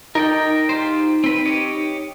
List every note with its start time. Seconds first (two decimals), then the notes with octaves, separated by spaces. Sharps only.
0.15 D#4 A#4 D5 G5
0.69 F4 G4 C5
1.24 C4 B4
1.45 G4 C#5 D#5